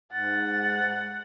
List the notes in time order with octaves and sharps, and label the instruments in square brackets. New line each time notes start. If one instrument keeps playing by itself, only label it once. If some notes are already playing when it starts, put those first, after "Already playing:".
[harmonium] G#2 [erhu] F#5 [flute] A6